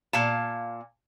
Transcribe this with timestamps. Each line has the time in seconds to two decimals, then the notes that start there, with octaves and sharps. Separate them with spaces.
0.13 A#2 F5 A5